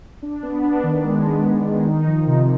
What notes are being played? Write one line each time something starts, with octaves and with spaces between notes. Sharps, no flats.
D4
B3
D4
D#3
G#3
B3
D4
D#3
D#4
F3
C3